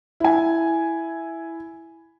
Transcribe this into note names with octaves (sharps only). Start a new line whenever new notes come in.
E4 G#5